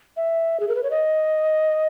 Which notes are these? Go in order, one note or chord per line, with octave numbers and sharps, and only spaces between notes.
E5
G#4
A#4
B4
C#5
D#5